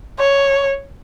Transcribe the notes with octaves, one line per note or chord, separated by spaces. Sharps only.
C#5